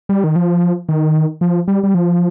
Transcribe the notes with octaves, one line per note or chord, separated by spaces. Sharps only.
G3
D#3
F3
D#3
F3
G3
G3
F3